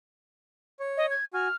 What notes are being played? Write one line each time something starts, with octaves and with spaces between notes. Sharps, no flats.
C#5
D#5
G#6
F#4 G#5 F6